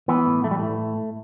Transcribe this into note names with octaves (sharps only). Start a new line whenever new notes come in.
E3 B3
A2
E3 A3
G3
A2 A3